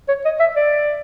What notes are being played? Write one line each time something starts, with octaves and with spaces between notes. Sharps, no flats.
C#5
D#5
E5
D5